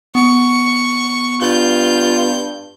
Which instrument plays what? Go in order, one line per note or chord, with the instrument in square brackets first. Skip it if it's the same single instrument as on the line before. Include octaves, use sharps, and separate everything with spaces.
[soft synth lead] B3 [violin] C#6
[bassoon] G2 [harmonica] F4 [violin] G6